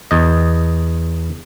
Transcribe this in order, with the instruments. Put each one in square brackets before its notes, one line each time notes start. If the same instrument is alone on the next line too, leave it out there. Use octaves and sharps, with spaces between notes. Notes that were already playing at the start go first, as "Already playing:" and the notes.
[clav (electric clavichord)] E2 D#5